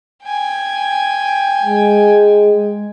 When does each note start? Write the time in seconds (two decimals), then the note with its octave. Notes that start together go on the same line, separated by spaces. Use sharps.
0.24 G5 G#5
1.63 G#3